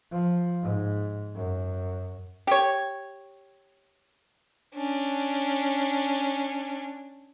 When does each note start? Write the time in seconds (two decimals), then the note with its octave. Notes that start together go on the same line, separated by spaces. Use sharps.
0.11 F3
0.62 G#2
1.35 F#2
2.47 G4 C#5
4.76 C#4 D4